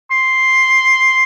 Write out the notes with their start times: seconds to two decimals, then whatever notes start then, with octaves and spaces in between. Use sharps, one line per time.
0.11 C6